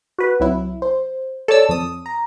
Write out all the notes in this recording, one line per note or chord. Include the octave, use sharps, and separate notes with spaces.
F#4 B4
C2 F#3 E4
C5
A4 C#5 D5 A5 E6
F2 D#6
A#5